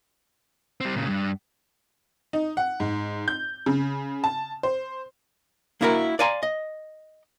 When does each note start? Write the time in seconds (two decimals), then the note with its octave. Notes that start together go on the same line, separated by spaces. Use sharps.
0.81 G3 C4
0.96 A#2 C#3
1.08 G2
2.33 D#4
2.57 F#5
2.80 G#2
3.28 G6
3.66 C#3
4.24 A5
4.63 C5
5.81 A#3 D4 E4 F#4 G#4 A#4
6.19 D5 F5 G#5 A#5 C6
6.43 D#5